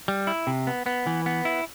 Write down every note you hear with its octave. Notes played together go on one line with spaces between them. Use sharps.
G3
E4
C3
B3
B3
E3
B3
E4